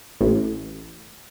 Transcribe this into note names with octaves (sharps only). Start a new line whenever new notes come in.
A1